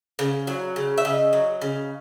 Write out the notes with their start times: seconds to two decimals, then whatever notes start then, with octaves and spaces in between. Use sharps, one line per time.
0.19 C#3
0.47 F#3
0.76 C#3
0.98 E5
1.05 C#3 D#5
1.33 F#3
1.61 C#3